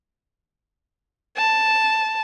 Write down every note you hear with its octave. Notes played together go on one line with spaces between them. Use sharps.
A5